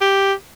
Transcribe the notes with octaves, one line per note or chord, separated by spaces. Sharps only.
G4